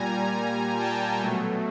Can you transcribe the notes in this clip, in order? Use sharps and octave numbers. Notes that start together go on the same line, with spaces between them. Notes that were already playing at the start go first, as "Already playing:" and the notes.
Already playing: A#2 G3 G#5 A#5
G5 A5
B2 F#3 A3